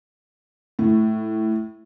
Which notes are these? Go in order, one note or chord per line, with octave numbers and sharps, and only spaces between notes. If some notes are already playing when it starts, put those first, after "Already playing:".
A2